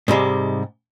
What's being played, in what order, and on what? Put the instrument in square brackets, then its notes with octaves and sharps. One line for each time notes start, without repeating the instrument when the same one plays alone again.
[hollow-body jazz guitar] G#2 C3 G3 G#3